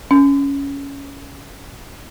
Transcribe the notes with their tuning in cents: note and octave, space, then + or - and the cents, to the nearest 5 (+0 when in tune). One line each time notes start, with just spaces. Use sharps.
C#4 +10